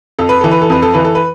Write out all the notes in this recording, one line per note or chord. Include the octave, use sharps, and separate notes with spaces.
F2 A4
B4
E3 A4
B4
A4
F2 B4
A4
E3 B4
A4
B4